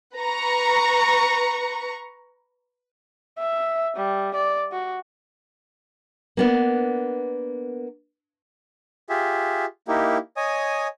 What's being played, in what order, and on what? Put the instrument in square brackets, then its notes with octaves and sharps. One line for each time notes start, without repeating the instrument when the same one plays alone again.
[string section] B4 A#5 C#6
[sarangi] E5
G3
D5
F#4
[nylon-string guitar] A#3 B3 D4
[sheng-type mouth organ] F4 G4 G#4 E5
A#3 D#4 E4 G4
C#5 D#5 G#5 D#6